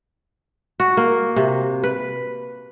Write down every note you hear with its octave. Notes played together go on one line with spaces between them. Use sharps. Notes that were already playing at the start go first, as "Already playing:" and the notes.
F#4
A#3
C3
B4